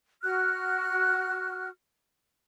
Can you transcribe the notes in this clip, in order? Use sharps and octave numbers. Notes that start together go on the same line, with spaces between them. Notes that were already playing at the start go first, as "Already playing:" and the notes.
F#4 F6 F#6